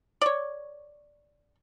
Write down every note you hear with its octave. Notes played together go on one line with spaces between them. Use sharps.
C#5 D5